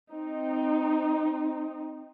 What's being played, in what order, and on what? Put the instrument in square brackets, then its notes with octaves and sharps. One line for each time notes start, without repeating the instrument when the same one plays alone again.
[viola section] C4 D#4